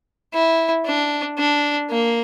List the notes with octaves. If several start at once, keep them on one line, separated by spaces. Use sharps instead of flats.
E4
D4
D4
A#3